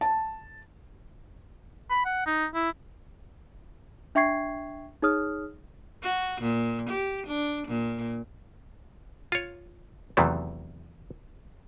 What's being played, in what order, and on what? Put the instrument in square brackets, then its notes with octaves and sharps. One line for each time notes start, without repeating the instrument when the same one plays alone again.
[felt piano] A5
[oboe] B5
F#5
D#4
E4
[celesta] D4 E5 G5 C#6 G#6 C7
D#4 G#4 C#5 D#6 F6
[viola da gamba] F#4
A#2
G4
D4
A#2
[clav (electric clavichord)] F4 C#5
E2 C3 D#3 E3 F#3 A3